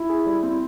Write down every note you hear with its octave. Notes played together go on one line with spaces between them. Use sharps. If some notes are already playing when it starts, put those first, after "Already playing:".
Already playing: E4
G#4
G3
C4